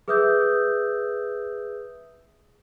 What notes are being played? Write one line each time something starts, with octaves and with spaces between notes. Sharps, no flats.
G#4 B4 E5 D#6 E6 G6